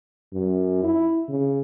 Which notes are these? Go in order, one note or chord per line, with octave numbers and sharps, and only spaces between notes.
F#2
E4
C#3